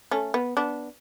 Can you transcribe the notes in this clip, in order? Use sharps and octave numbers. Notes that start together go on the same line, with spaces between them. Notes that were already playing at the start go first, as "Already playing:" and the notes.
A3 C#4
B3
B3 D4